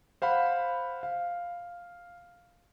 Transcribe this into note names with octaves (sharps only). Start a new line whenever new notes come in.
C5 F5 F#5 B5
F5